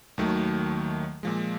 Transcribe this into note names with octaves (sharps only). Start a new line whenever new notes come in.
D#2 D#3 F#3 A3
A#2 F3 G#3